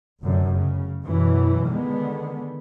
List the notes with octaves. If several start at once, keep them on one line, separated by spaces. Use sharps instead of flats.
F1 F#2 D3
C#3
F#2 B2 E3
D3 D#3 G#3 B3